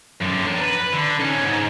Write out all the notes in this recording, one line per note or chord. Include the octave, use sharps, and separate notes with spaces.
F#2 D3
D4 A#4
B4
D3
C#4 D#4
G#2